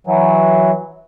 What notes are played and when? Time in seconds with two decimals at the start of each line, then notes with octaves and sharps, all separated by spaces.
0.07 E3 F#3